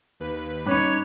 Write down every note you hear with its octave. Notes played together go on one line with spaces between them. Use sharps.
D#2 B4
G2 C#4 D#4 C#5 B5 D6 F#6